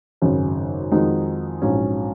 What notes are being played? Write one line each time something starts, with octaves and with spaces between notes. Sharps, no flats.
G#1 F#2 C#3
F2 D#3 G#3 D#4 F#4
A#1 G#2 F#3 C#4